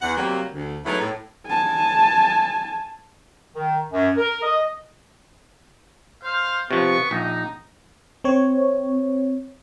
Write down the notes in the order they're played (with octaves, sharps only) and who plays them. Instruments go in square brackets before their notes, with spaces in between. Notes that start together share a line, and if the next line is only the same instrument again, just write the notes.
[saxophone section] E2 F#5
C3 F#3 G3 A#3
D2
F#3 G#3 A3 B3 D#4 E4
A2
[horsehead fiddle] G#5 A5
[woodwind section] D#3
F#2
A#4
D#5
[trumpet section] C5 F5
[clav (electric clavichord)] C3 F3 [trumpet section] B3 C#6
[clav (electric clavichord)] A#1 [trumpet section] D#4
[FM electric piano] C4 C#5